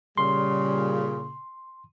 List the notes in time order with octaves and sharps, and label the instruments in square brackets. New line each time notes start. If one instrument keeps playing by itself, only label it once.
[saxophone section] A#2 C#3 [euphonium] G3 [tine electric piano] C6